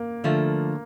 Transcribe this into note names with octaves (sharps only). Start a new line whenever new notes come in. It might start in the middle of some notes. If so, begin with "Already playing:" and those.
Already playing: A#3
D3 F3 A3